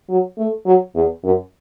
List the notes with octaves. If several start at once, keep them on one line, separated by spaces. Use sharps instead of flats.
F#3
A3
F#3
E2
F#2